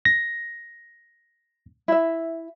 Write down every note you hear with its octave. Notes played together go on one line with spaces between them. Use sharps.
A#6
E4 E5